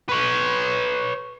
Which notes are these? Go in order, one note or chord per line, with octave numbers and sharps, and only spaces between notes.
B4 C#5